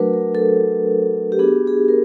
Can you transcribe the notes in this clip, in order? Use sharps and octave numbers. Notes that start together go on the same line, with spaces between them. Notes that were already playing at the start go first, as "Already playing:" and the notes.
Already playing: F#3 A3 D4 F#4 A#4 B4
A#4
A4
G4
B3 D4 F#4 G#4
G#4
A#4